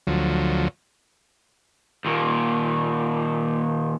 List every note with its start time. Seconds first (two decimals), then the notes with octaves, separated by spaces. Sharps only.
0.07 D2 F3 F#3
2.05 D#2 A#2